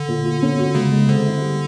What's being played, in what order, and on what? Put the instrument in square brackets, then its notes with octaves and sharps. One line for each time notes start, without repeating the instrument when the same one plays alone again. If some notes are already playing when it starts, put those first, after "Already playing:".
Already playing: [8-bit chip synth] D3
[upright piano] A#2
F4
C#4
F#4
[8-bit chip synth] C#3 [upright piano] G#3
[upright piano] G#3
[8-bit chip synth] D3 [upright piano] C4
[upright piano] E4
G3